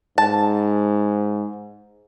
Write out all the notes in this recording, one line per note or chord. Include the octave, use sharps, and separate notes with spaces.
G#2 A5